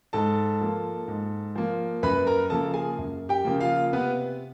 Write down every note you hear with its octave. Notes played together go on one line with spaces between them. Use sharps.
G#2 A4 A5
F3 A#3
G#2
F3 A#3
F#2 B4 B5
A#4 A#5
C#3 F3 A#3 A4 A5
G#4 G#5
F#2
G4 G5
C#3 F3 A#3
F4 F5
C3 B3 B4